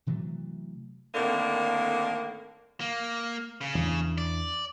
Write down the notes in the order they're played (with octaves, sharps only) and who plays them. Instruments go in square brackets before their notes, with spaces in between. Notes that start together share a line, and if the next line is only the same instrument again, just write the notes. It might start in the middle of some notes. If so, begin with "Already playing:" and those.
[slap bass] C3 E3 F#3 A3
[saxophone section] A2 D3 D#3 A#3 C4
[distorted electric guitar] A#3
C#3
[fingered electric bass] E2 E3 D4
[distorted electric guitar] D5